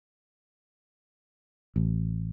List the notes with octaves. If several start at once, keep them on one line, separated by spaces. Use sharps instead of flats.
A1